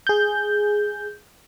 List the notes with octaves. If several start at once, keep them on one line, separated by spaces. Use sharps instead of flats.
G#4 G6